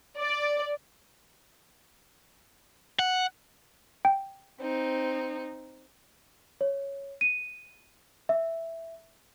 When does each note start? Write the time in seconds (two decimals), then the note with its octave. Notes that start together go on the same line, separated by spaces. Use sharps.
0.19 D5
2.99 F#5
4.05 G5
4.60 C4 D#4
6.61 C#5
7.21 D#7
8.29 E5